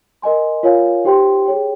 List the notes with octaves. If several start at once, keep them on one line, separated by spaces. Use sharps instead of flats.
A#4 D#5 G#5 C6
F4 A#4 C#5 F5 G#5
D#4 G4 C5 G5 C6
G#4 C#5 G5